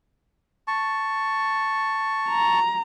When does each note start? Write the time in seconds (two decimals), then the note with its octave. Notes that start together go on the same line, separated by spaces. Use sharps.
0.68 A5 C#6
2.29 A#5